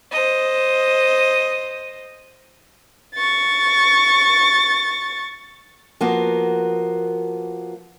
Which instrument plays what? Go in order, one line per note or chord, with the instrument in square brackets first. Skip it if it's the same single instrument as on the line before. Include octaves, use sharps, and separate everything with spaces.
[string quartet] C5 D#5
C#6 A6
[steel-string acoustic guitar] F3 A#3 B3 F#4 A#4